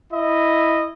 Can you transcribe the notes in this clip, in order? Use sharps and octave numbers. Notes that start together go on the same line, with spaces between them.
E4 D#5